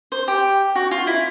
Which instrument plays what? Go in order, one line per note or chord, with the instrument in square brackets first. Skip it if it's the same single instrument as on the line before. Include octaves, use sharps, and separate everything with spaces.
[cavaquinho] C5
G4
F#4
F4
E4